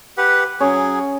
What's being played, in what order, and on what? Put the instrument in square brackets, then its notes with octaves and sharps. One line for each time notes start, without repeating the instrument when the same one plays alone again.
[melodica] G4 B4 F#5
[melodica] F#3 G#4 [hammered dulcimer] C#4 C#5